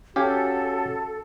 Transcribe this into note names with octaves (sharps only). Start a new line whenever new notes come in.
C#4 F#4 G4 A4 F5 G#5